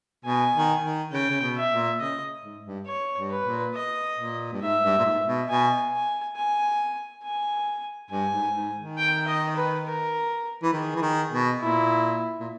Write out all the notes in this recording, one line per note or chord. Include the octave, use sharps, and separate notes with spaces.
B2 G#5
D#3
D#3
C#3 G5
C#3
B2
E5
A#2
C#3 D#5
G#2
G2
C#5
G2
B4
A#2
D#5
A#2
G2
G#2 E5
G2
A#2
G#2
B2
B2 G#5
G#5
G#5
G#5
G2 G#5
G#2
G#2
D#3
G5
D#5
B4
A#4
E3
D#3 G#4
E3
D#3
B2
A#2 E4
A#2